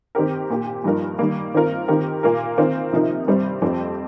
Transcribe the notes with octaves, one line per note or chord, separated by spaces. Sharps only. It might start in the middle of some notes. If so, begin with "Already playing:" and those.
D#3 C4 G4 A#4
A#2 A#3 G4
G2 F3 D#4 A#4
D#3 G3 A#3
D#3 C4 F4 A#4
D#3 C4 G4 A#4
A#2 A#3 F4 A#4
D#3 C4 F4 A#4
C3 F3 D#4 A#4
G2 G3 C4
F2 F3 C4 G4